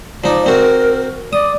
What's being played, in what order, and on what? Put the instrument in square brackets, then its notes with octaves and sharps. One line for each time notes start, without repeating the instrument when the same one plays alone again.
[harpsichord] F3 D#4 [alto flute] D5
[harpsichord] C4 F#4 [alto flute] A#4
[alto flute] D5 [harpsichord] D#6